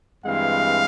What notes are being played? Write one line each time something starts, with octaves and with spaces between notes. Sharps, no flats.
G2 E3 G#3 C4 F5